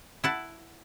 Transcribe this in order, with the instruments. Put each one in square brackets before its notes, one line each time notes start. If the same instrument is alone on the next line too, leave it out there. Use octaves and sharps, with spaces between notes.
[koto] E4 F#5 A5